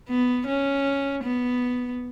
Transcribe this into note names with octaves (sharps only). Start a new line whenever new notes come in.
B3
C#4
B3